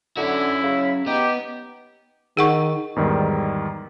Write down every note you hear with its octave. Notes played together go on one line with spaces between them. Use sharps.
D3 C#4 E4 F#4
C#3
B3 D#4 G4
D#3 G#4 F#5 C#6
E2 G#2 D#3 G3